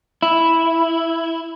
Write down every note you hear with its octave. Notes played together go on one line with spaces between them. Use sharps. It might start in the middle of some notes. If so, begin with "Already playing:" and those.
E4